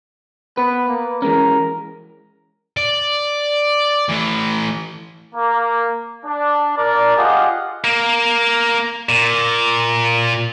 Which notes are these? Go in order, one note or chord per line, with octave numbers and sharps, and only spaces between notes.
B3 B4
A#3
E3 G#3 C#4 A#4
D5
E3 A3
A#3
D4
D4 A#4 D5
F4 G4 G#4 D#5 F#5
A#3
A#2